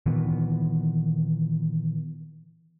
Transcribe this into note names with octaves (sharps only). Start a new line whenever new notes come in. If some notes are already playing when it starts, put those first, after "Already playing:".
A#2 D#3 E3 B3